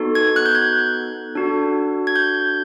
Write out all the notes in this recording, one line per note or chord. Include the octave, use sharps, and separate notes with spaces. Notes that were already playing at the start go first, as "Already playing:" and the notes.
Already playing: B3 D#4 F#4 A4
G#6
F#6
G6
G#6
D4 F#4 A4
G#6
G6